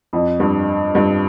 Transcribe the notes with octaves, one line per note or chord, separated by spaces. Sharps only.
F2
G2
G2